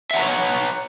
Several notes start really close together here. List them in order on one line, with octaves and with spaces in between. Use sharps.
E5 F#5 A#5 B4 C#5